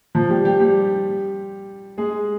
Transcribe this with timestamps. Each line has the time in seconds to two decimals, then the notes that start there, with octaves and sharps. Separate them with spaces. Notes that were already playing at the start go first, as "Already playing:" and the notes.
0.15 F3 F4
0.30 G3 G4
0.45 G3 G4
0.60 G3 G4
1.98 G#3 G#4